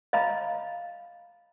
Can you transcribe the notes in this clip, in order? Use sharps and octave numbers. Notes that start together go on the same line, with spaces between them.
D#5 F5 A#5 B5